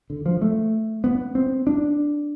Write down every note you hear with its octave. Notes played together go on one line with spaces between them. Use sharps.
D3
F3
A3
B3
C4
D4